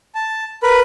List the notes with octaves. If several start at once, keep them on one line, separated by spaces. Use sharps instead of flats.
A5
A#4 B4 B5